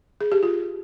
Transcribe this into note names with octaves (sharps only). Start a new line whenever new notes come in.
G#4
G4
F4